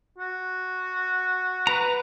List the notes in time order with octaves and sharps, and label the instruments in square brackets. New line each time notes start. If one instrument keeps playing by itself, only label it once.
[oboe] F#4
[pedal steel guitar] B4 A#5